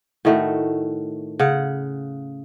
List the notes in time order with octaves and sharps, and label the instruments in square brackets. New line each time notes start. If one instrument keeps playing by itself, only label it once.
[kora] A2 D#3 A3 F#4
C#3 F#5